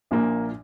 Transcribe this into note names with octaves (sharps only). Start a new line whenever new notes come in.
A#1 A#2 A#3